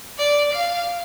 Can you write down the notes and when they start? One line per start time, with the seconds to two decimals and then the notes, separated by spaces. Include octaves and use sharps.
0.18 D5
0.53 F5